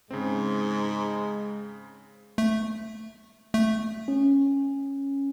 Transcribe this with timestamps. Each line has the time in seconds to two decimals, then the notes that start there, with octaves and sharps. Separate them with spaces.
0.11 G#2 C#3 G#3 C4
2.38 A3
3.54 A3
4.08 C#4